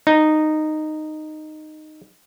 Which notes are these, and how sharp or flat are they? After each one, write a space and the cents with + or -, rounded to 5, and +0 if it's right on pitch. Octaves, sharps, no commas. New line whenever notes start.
D#4 -10